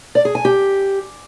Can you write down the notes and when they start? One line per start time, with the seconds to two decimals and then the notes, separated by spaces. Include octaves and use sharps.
0.15 D5
0.25 G#4
0.35 G#5
0.45 G4